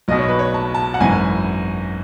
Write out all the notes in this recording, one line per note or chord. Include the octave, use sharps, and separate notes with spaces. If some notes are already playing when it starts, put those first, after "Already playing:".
B1 B2 D#5
C#5
B4
C#5
A5
A5
F#5
G#1 F#2 E3 G#5